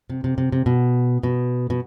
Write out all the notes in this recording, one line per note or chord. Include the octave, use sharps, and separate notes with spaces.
C3
C3
C3
C3
B2
B2
B2